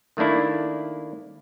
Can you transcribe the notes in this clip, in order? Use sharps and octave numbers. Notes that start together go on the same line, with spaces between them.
D#3 A3 A#3 D4 E4